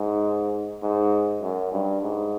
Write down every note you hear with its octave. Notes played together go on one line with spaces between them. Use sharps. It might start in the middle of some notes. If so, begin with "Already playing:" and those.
Already playing: G#2
G#2
F#2
G2
G#2